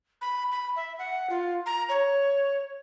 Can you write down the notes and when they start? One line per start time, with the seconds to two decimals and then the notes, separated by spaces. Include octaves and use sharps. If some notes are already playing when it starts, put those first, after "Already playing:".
0.21 B5
0.52 B5
0.76 E5
0.99 F#5
1.30 F4
1.66 A#5
1.89 C#5